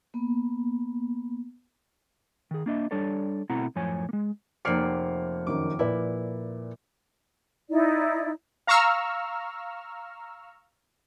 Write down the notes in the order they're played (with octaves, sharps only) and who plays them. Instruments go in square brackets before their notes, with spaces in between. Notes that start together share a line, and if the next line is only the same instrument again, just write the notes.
[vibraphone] A#3 B3
[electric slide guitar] D#3 G#4
A#3 D4 D#5 E5
G3 D4 A4 C#5 D5
B2 A3 C4 E4 F#5 A#5
F#2 A2 F3 C#5 G#5
G#3 A#3
[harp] F1 A#3 D5 [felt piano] F6 C7 C#7
[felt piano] F#2 D#3 [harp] D6
[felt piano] A#2 B4 D5 [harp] E4
[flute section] D#4 E4 D5
[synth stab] F5 A#5 C#6 E6 F6